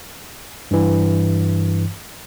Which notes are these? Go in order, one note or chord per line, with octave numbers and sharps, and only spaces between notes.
G2 E3